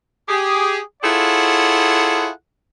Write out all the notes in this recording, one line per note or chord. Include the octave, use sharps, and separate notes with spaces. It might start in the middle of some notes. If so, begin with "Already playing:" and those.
G4 G#4
E4 F4 G#4 A4 C#5 F#5